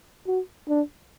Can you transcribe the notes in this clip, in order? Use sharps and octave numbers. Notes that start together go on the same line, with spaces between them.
F#4
D4